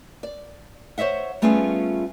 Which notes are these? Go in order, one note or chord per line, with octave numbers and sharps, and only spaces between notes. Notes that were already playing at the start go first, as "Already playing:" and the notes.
D5
C5 C#5 D#5 E5 F#5
G3 A3 B3 C#4 F4 G#4